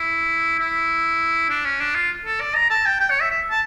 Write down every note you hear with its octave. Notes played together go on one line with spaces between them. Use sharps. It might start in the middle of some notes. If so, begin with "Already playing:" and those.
Already playing: E4
E4
D4
C#4
D4
F4
A4
D5
A#5
A5
G5
G5
C#5
E5
E5
A5